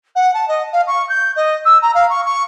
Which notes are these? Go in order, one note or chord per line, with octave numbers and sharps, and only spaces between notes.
F#5
A5
D#5
F5
C#6
G6
D#5
E6
A#5
F5
C#6
C#6